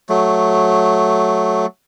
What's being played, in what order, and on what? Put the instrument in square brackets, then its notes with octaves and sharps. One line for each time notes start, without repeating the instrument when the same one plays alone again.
[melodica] F#3 A3